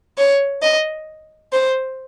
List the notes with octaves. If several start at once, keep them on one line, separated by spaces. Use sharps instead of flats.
C#5
D#5
C5